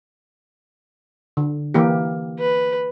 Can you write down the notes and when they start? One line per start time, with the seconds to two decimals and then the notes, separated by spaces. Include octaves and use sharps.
1.37 D3
1.74 E3 A#3 G4
2.39 B4